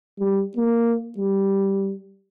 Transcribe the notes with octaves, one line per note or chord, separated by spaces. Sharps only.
G3
A#3
G3